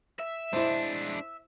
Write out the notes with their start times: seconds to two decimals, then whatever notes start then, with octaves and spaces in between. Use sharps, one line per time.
0.19 E5
0.53 G#3 D4 E4 C5